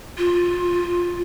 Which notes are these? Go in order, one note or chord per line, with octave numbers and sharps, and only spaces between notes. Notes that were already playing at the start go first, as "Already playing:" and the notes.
F4